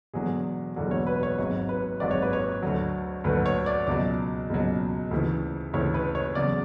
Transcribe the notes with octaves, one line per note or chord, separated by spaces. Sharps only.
E1 E2 D3 F#3 G#4
E1 E2 D3 F#3
C#5
B4
C#5
G#1 G#2 F#3 C#5
B4
G#1 G#2 F#3 D5
C#5
B4
C#5
D2 D3 F#3
D2 D3 F#3 B4
C#5
D5
C#2 B2 F#3 D5
C#2 B2 F#3
D2 C#3 E3
D2 C#3 E3 C#5
B4
C#5
E2 C#3 F#3 D5